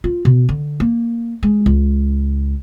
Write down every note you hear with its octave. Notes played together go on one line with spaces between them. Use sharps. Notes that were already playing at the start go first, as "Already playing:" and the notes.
F4
B2
D3
A#3
G#3
C#2